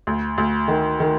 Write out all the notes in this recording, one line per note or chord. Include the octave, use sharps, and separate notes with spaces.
D2
D2
D#3
D#3